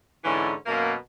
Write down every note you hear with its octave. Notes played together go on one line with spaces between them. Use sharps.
G#2 D3 E3 C#4 E4
F#2 B2 A#3